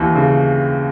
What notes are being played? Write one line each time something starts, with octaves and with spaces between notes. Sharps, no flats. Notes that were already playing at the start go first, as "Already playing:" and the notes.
Already playing: D#2 E3
C#3